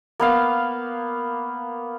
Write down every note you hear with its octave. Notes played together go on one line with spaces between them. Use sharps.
A#3 B3 F5